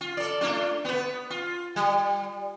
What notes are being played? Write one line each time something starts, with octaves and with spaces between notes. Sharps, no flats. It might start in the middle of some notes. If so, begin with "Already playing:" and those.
F4
A4 D5
A3 D4 F4
B3 B4
F4
G3